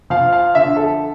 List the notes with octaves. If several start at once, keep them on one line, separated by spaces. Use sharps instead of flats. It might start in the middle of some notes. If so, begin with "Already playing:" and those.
F3 F5
F5
D3 E5
A4